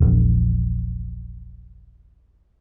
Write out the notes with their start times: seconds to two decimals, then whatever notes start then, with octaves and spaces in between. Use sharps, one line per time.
0.01 E1 A#1